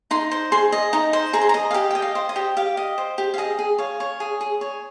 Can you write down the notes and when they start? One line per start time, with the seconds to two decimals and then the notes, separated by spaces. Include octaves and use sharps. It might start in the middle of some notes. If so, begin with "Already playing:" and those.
0.11 D#4 C6
0.31 C5
0.52 G#4 C6
0.72 D#5
0.93 D#4 A#5
1.13 C5
1.33 G#4 A#5
1.41 C6
1.49 A#5
1.54 D#5
1.71 F5
1.74 G4 G5
1.91 D#5 G5
2.02 F5
2.15 C5
2.29 D#5
2.36 G4
2.57 G4 F5
2.77 D#5
2.98 C5
3.18 G4
3.34 F5
3.38 G#4 D#5
3.59 G#4
3.78 C#5 F5
4.00 C#5
4.20 G#4
4.41 G#4
4.61 C#5